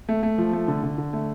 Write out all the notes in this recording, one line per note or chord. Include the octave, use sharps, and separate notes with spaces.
A3
A3
F3
A3
D3
D3
D3
A3